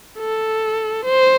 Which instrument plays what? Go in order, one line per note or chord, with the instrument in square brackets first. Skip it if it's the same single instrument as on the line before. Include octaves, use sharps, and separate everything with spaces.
[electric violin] A4
C5